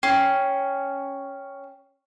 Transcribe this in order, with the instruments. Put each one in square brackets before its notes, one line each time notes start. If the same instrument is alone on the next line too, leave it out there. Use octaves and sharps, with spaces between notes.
[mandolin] C#4 [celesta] G5 G#6 C7